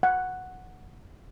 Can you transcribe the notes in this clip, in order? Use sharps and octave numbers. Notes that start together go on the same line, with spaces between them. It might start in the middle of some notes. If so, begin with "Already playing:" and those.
F#5